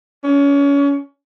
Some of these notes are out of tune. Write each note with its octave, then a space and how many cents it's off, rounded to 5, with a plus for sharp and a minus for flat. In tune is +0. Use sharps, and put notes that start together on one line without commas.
C#4 +30